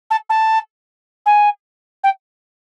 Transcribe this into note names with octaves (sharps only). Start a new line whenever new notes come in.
A5
A5
G#5
G5